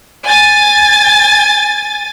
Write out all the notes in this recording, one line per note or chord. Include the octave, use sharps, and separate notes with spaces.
G#5 A6